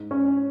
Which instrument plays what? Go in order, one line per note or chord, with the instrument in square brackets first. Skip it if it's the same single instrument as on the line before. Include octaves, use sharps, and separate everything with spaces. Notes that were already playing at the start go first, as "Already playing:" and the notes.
Already playing: [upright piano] G#2
[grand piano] C#4 C#5
[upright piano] C#4